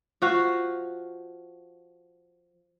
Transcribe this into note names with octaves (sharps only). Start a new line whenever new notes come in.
F3 F#4 F5